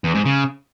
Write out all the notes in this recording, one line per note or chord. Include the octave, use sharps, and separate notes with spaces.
E2
G#2
C#3